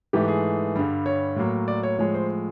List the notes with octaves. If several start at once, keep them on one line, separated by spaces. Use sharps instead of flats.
G#2 E3 A3 G4
G#4
G2 D3 G3
C#5
A2 F#3 A#3
D5
C#5
A2 F3 G#3 C#5
C5